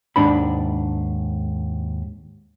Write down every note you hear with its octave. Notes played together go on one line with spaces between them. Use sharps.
D#2 G#2 D4 B5